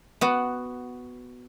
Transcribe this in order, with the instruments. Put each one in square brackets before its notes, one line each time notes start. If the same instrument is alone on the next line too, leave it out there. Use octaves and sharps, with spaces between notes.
[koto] B3 F#4